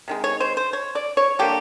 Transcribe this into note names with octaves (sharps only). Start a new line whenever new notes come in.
C3 D#3 G#3
C#5
C5
C5
C#5
D5
C#5
D3 G3 A#3 G4